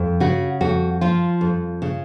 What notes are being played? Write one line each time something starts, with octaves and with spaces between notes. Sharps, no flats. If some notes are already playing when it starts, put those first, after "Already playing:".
Already playing: F2
C#3 F#4
F2 F#4
F3 F4
F2
C#3